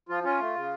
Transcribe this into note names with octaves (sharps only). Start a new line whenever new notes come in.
F3 F4
C#4 F4
A3
C#3